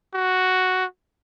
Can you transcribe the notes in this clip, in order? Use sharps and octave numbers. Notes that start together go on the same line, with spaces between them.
F#4